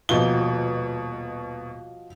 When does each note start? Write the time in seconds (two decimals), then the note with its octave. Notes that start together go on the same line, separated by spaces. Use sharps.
0.09 D#1 B2 F3 F#4 D#5 G7